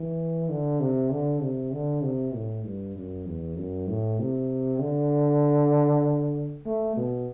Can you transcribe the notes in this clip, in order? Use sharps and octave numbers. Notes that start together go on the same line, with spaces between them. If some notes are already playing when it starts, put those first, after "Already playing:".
Already playing: E3
D3
C3
D3
C3
D3
C3
A2
G2
F#2
E2
F#2
A2
C3
D3
A3
B2